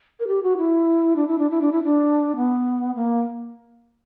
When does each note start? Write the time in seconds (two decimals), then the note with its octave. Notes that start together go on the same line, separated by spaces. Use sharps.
0.20 A#4
0.27 G4
0.43 F#4
0.57 E4
1.16 D4
1.28 E4
1.38 D4
1.51 E4
1.61 D4
1.72 E4
1.84 D4
2.36 B3
2.95 A#3